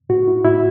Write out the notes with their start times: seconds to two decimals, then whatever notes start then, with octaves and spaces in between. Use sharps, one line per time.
0.09 A2 F#4
0.27 E4
0.44 A2 E4